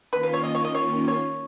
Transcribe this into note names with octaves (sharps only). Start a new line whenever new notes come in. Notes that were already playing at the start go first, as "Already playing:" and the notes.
D#3 A#3 C#4 F4 B4
B4
C#5
D#5
C#5
D#5
C#5
C#5